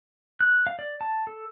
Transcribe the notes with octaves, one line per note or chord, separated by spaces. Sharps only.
F#6
F5
D5
A5
A4